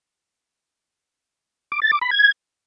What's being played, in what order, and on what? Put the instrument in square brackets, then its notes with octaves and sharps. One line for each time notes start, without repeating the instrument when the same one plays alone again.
[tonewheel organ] D6
A6
D6
B5
G#6